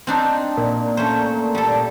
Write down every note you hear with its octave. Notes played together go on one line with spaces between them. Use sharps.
C4 D4 D#4
A#2
A3 C#4 C5
G3 A4